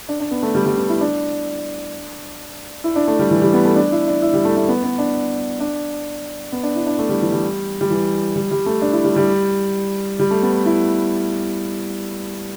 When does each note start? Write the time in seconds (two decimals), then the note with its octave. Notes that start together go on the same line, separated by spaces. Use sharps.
0.09 D4
0.20 D4
0.31 B3
0.43 A3
0.55 G3
0.66 G3
0.78 B3
0.89 E4
1.01 D4
2.84 E4
2.96 D4
3.08 A3
3.19 G3
3.31 E3
3.42 G3
3.53 B3
3.65 A3
3.76 D4
3.92 E4
4.08 D4
4.22 E4
4.34 G3
4.45 A3
4.57 A3
4.68 B3
4.84 B3
4.98 D4
5.60 D4
6.52 B3
6.63 D4
6.76 E4
6.87 D4
6.99 A3
7.09 G3
7.21 E3
7.32 G3
7.81 G3
7.90 E3
8.36 G3
8.51 G3
8.66 A3
8.82 D4
8.93 E4
9.04 G3
9.16 G3
10.20 G3
10.31 A3
10.42 B3
10.66 E4